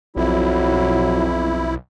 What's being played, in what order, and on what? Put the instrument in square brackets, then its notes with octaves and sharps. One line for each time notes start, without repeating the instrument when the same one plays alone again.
[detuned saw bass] B1 [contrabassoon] F2 [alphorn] F#3 [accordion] E4